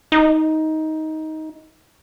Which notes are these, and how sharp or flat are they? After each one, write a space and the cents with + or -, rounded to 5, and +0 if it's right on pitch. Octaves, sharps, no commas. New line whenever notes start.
D#4 +15